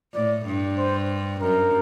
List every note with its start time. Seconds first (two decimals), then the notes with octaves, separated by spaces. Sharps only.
0.14 A2 D5
0.46 G2
0.78 C5
1.41 F#2 A#4